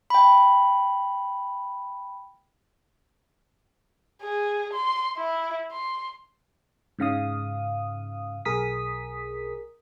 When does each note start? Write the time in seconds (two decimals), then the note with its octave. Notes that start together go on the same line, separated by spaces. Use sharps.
0.10 G5 B5
4.22 G#4
4.73 C6
5.17 E4
5.72 C6
6.99 G#2 C#3 F5 D#6
8.45 B1 G#4 A#4 D#6 B6